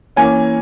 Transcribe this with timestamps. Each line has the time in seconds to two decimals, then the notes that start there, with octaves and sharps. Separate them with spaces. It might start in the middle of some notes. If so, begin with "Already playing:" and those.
0.16 E3 A#3 C#4 G#5